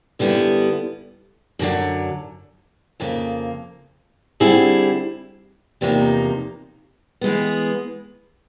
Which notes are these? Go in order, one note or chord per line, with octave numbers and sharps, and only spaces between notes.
F#2 D3 G3 B3 E4
F#2 D3 F#3
F2 C#3 F3 A#3
D3 G3 C4 E4 G#4
E2 C3 F3 A#3 D#4
E3 G#3 B3